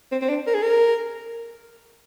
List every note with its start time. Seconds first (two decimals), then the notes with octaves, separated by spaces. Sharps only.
0.12 C4
0.22 C4
0.29 D4
0.47 A#4
0.54 G#4
0.62 A#4